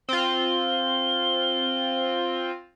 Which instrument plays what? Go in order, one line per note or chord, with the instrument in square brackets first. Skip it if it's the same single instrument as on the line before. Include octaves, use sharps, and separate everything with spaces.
[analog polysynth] C4 F4 [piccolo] G7